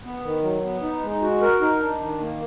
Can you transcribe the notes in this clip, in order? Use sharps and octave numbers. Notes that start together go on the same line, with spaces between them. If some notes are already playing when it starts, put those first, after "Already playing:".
B3
D#3
F#3
B3
D#4
G#3
F#4
A#4
D#4
D4
D#3
A#3